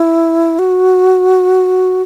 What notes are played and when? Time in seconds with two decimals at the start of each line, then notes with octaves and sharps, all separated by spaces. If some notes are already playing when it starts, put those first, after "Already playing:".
Already playing: E4
0.59 F#4